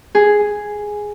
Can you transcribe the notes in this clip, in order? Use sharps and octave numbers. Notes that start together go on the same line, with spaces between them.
G#4